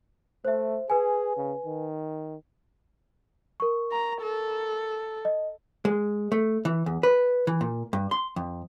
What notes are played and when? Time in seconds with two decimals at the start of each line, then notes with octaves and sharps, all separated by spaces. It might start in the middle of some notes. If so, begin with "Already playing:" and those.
0.45 A3 C5 E5
0.90 G#4 B4 G#5
1.37 C#3
1.66 D#3
3.60 A#4 C#6
3.92 A#5
4.22 A4
5.25 D#5
5.85 G#3
6.32 A3
6.65 E3
6.86 E2
7.03 B4
7.47 E3
7.61 A#2
7.93 G2
8.11 C6
8.36 F2